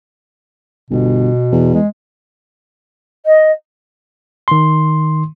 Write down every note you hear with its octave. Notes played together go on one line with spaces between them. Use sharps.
G1 B2
E2
G#3
D#5
D#3 C6